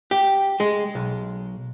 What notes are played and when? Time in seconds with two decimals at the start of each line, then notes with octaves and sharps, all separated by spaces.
0.11 G4
0.60 G#3
0.95 B1